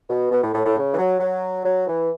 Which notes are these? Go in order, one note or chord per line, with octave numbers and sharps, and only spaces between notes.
B2
B2
A2
A2
A2
C#3
E3
F#3
F#3
F#3
E3